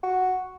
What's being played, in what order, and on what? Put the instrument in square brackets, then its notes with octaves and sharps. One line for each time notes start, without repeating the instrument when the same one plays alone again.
[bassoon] F#4